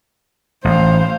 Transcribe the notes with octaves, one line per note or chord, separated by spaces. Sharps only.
A1 C5 F5